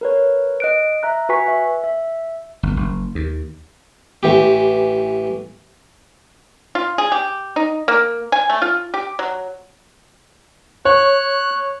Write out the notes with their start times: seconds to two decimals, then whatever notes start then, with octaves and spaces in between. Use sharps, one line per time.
0.01 A#4 B4 C#5
0.60 D#5 F#6 D7
1.03 E5 A#5 F#6
1.29 F#4 B4 G#5 C#6 B6
1.48 E5
1.84 E5
2.63 G1
2.76 F#1
3.15 D#2
4.23 A1 E3 G4
6.75 F4
6.98 G#4
7.12 G4
7.56 D#4
7.88 A#3
8.32 G#5
8.50 A3
8.62 F4
8.94 G4
9.19 F#3
10.85 C#5 F#6